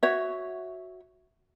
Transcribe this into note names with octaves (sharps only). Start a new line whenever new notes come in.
F#4 C#5 E5